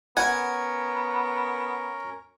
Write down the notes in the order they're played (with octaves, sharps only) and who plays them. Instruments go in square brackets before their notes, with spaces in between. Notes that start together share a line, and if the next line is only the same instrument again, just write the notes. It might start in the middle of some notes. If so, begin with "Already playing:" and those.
[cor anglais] B3 [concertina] C#4 A#4 [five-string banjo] F#5 [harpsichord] G#5